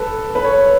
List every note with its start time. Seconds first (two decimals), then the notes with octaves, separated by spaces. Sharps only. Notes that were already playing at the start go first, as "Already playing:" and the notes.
Already playing: A4 B4
0.35 B4
0.44 C#5